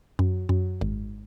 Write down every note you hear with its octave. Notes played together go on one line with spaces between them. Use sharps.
F#2
F#2
G#1